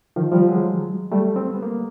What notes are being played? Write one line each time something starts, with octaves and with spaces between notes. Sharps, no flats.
D#3 F3
F3 G3
F#3 G#3
G3 A3
C4
B3
A#3